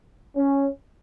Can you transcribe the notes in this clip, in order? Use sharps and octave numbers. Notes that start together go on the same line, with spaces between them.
C#4